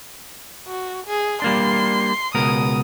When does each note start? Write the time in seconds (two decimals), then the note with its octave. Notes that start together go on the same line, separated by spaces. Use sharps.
0.67 F#4
1.07 G#4
1.42 G3 A#3 D4 C6
2.35 C#2 B2 A#4 D#6